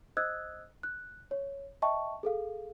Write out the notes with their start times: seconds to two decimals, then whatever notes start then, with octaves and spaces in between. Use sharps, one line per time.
0.17 C5 D#5 D#6 E6 F#6 G#6
0.83 F#6
1.31 C#5
1.82 D#5 E5 G5 A5 C#6
2.23 G#4 A4 F5